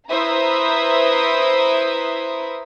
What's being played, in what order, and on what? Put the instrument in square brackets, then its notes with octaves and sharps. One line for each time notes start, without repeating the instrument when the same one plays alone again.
[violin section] E4 B4 C5 E5 A#5 D#6